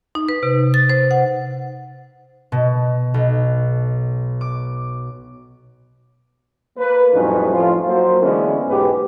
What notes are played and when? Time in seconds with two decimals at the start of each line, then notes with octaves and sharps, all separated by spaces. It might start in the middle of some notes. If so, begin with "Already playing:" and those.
0.15 D#4
0.29 B4
0.43 C3
0.74 A6
0.90 C5
1.11 F#5
2.52 B2
3.14 B1
4.41 D6
6.78 A#3 B4
7.13 F2 A2 F#3 G3 C#4 D#4
7.54 F2 A2 F3 F4
7.87 F#3 A#3 C5
8.22 D3 E3 G#3 B3 C#4
8.68 B1 G#2 G#3 B3 G4 B4